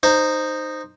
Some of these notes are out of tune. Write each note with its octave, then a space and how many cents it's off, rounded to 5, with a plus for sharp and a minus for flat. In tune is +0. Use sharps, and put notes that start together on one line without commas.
D#4 -15 C5 +0